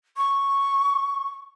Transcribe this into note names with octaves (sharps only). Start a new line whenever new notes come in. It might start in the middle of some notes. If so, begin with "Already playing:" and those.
C#6